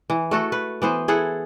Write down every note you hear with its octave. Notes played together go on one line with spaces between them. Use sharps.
E3
A3 F#4 A4
B4
E3 B3 C5
E4 G#4 A4 F#5